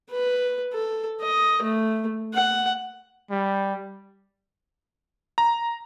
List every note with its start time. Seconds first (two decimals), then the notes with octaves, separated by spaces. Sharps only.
0.11 B4
0.73 A4
1.21 D#5
1.63 A3
2.34 F#5
3.30 G3
5.38 A#5